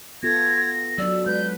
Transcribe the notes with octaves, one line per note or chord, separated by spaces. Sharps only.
B3 F4 A4 G#6 A#6
F#3 D4 D5 E6
G#3 B4 G6